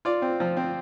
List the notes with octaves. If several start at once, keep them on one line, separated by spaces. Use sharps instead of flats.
F4 D5
C4
F3
C4